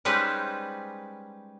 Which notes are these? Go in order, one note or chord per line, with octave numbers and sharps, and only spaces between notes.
G3 G#3 C#4 D#4 B4 C5